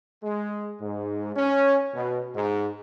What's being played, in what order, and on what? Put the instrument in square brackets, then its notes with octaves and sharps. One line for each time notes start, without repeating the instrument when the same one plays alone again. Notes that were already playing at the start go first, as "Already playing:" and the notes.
[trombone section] G#3
G#2
C#4
B2
G#2